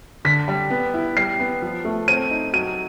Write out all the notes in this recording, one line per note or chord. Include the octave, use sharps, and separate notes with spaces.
D3 B6
G3
B3
E4
G3 C7
B3
F3
A3
C4 D#7
D#4
F#3 D#7